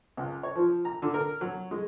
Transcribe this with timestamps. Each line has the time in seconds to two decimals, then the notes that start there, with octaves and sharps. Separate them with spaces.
0.17 C#2
0.43 C#5
0.55 F3
0.85 A#5
1.02 D3
1.14 A#4
1.41 F#3
1.71 G#3